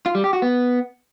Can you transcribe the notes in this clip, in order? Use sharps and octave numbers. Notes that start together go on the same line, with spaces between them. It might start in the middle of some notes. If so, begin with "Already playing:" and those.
F4
G3
G4
F#4
B3